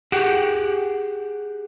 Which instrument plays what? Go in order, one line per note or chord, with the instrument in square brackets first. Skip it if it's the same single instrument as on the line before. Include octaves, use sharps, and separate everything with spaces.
[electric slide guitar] G4 G#4 F#5 G5